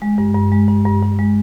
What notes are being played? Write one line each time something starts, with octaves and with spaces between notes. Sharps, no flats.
G#3
G2
G2
G#3
G2
G2
G2
G#3